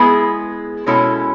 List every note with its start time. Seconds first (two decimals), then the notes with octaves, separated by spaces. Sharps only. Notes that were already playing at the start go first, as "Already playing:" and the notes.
Already playing: G#3 B3 E4 G#4
0.86 B2 G#3 C#4 E4 A4